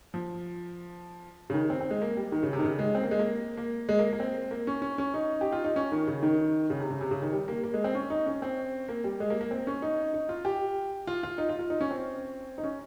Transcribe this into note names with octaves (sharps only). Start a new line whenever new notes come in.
F3
C#3
D#3
C4
C4
G#3
A#3
G3
D#3
C#3
C3
D#3
C#3
G#3
C4
A#3
G#3
A#3
A#3
G#3
A#3
A#3
C4
A#3
C#4
C#4
C#4
D#4
G4
F4
D#4
C#4
D#3
C#3
D#3
C#3
C3
C#3
C3
C#3
D#3
G3
A#3
A#3
G#3
C4
C#4
D#4
C#4
C4
A#3
G3
G#3
A#3
A#3
C4
C#4
D#4
D#4
F4
G4
F4
F4
D#4
F4
F4
D#4
C#4
C4
D#4
C#4